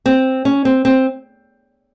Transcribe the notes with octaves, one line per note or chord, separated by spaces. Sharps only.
C4
C#4
C4
C4